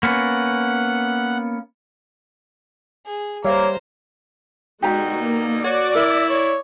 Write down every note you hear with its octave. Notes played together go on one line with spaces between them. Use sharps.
A#3 B3 C#4 F#5
G#4
G3 A#3 A#4 C5 C#5 E5 F5
B2 D3 G#3 D#4 F#4 G4 A#5
A#3
F#4 C#5 D5
E4 A#4 E5
C#5